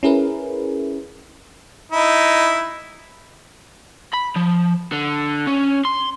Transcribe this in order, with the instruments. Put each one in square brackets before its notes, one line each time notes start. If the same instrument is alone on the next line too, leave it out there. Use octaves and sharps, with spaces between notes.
[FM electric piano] C#4 E4 G#4 A#4 B4
[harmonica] D#4 E4
[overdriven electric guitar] B5
F3
D3
C#4
C6